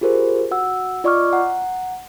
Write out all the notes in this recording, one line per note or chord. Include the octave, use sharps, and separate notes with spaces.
F4 G4 G#4 A#4 C5
F#4 F#5 E6
F4 D5 D#5 C#6 D6 F6
F#5 A#5